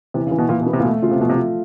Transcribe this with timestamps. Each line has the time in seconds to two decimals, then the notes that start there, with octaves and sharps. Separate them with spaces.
0.14 C3 E3
0.27 C#3
0.31 E3
0.38 B2
0.49 A#2 E3
0.61 B2
0.66 B3
0.73 C3
0.79 A#2
0.84 B2 A3
1.02 C#3 F4
1.11 C3
1.19 B2 F3
1.30 C3
1.37 F4